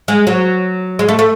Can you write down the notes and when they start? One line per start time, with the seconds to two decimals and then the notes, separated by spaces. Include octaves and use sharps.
0.08 G#3
0.27 F#3
0.99 G#3
1.09 A3
1.19 A3